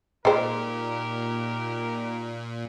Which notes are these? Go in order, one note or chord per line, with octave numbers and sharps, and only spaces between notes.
A#2 G#3 D#4 G4 A#4 C5